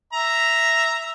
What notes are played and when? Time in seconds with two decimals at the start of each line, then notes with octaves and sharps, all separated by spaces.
0.13 E5 A#5